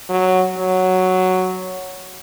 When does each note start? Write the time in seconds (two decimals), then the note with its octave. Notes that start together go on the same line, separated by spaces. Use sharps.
0.10 F#3
0.58 F#3